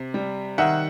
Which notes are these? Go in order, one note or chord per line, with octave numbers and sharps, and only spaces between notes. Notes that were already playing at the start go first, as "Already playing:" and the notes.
Already playing: C3
G3
D#3 E5 F#5